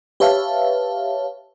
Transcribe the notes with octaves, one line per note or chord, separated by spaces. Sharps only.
G4 B4 C#5 E5 F5 A5